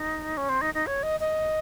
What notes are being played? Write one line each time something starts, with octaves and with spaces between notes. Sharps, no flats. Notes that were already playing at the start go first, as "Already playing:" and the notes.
Already playing: D#4
C#4
C4
D#4
D#4
C#5
D#5
D#5